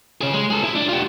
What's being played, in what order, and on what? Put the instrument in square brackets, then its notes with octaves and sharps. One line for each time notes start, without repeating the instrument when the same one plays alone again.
[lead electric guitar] C#4 G#4
G#3
G#4 A4
E4
D4
F4 G4